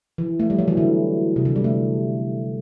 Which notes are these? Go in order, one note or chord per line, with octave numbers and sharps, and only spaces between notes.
E3
A3
G3
F#3
E3
D3
C3
D3
G3
A3